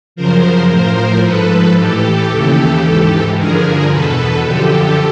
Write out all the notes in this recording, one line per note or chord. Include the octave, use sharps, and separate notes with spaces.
F#2 C#3 F3 A#4 C5
A2 F3 A#4 C5
G#2 F3 A4 B4
A2 E3 G4 A4
D#2 C#3 E3
G#2 E3
G2 D3 F3 G#4 A#4
E2 B2 A4 B4
F#2 D3 F3 G4 A4